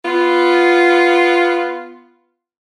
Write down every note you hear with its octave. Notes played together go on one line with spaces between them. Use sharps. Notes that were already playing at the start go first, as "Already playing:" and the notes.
B3 F4